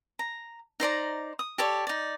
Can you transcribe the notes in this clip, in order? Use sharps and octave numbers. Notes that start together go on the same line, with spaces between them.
A#5
D#4 C5 D5 A#5
D#6
G4 A4 C#5 D5
D#4 D5